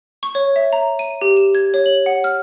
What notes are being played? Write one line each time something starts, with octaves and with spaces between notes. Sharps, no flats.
C#6
C#5
E5
A#5
D#7
G4
E7
G#6
C#5
F#7
F#5
F6